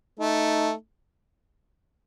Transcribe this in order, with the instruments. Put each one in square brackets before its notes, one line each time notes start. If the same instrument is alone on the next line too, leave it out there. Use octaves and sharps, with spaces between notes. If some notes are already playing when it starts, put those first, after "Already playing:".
[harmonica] A3 [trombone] D#4